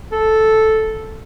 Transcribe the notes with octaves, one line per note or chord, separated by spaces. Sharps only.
A4